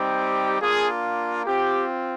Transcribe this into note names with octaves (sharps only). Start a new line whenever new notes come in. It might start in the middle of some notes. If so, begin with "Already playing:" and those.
Already playing: G3 C4 D#4 G4
A#3 D4 F4 G#4
C4 F4 G4